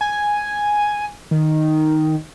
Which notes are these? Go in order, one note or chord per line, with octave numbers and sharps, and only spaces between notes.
G#5
D#3